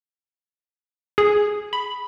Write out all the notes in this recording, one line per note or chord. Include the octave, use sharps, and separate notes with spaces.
G#4
B5